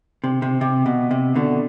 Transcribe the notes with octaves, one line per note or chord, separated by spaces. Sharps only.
C3
C3
C3
B2
C3
B2 D3